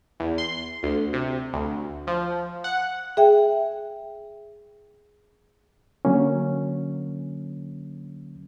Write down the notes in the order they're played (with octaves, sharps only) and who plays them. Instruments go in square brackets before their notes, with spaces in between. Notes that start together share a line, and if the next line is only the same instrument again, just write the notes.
[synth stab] E2
C6
D2
C3
D2
F3
F#5
[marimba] G#4 E5 G5
[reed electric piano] D3 F#3 A#3 C#4